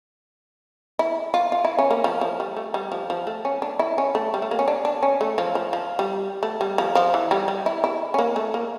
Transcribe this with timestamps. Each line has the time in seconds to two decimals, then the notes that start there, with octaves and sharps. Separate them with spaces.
0.99 E4
1.34 F4
1.52 F4
1.65 E4
1.79 C#4
1.91 A#3
2.04 F3
2.21 F3
2.40 G3
2.56 A3
2.74 G3
2.92 F3
3.10 F3
3.27 A3
3.45 C#4
3.62 D4
3.79 E4
3.98 C#4
4.15 A3
4.34 G3
4.42 A3
4.51 A#3
4.59 C#4
4.68 D4
4.85 D4
5.03 C#4
5.21 A3
5.38 F3
5.55 F3
5.73 F3
5.99 G3
6.43 A3
6.61 G3
6.78 F3
6.95 F3
7.14 E3
7.31 G3
7.48 G3
7.66 E4
7.84 E4
8.14 C#4
8.19 A#3
8.36 A3
8.54 A#3